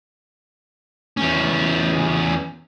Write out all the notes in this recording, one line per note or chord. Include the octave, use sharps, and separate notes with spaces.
E2 C#4